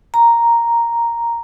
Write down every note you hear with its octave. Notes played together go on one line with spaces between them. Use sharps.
A#5